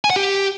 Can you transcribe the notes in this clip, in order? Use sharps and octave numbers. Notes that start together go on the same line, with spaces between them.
G#5
F#5
G4